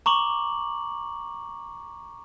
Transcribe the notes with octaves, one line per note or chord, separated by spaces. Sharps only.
A#5 C#6 D6 F#7